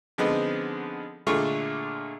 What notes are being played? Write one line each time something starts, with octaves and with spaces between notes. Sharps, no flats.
D3 F3 G#3 B3 C4 D#4
A#2 D3 G#3 A3 F4 C#6